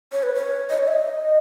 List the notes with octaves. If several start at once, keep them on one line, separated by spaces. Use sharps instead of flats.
C#5
B4
C#5
D#5
C#5
E5
D#5